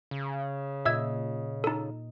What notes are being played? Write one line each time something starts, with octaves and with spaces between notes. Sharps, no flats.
C#3
A#2 D#5 E5 E6 G#6
D#4 A4